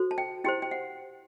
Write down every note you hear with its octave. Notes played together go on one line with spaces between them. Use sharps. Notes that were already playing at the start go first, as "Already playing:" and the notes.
Already playing: F#4 A4 C5
A5
G5
E4 G4 C5 G5
G5
F#5